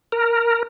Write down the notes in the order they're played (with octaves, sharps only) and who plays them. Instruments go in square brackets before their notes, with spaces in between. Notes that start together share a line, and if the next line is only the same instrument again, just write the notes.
[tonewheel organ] A#4